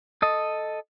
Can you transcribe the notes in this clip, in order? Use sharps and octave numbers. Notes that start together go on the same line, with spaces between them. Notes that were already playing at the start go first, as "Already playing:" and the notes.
A4 D#5